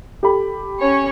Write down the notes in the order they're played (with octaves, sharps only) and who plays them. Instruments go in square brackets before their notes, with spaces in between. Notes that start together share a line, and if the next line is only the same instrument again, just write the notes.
[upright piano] G4 A4 B5
[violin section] C#4 C#5